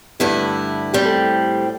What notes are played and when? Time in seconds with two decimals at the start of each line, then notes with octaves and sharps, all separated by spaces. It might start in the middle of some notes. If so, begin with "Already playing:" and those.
0.20 G2 D3 A3 E4 G4
0.93 A2 G3 C4 G4
1.05 A4